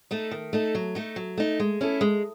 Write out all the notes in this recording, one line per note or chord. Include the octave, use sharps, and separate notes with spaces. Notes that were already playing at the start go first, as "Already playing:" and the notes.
A3 D#4 A4
D#3
A3 D#4 A4
F#3
A3 D#4
F#3
A3 D#4
G#3
C#4 E4 A4
G#3